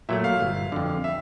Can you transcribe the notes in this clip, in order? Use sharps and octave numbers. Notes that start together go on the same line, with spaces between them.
A#2 F#3 A3 E5
F5
G1
F2 D3
E5